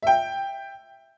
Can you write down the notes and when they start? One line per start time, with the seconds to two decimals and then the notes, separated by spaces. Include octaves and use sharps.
0.03 E5 G5